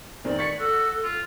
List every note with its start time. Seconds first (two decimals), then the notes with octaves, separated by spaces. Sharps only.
0.24 F1 D#3 C4 D5
0.39 C#6 A6 B6 C#7
0.59 F#4 A4
1.04 F4